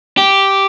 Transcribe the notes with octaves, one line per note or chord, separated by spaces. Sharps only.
G4